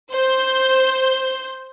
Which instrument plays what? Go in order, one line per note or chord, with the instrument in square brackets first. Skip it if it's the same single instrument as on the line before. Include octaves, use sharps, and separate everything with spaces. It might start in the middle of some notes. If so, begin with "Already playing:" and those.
[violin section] C5 G6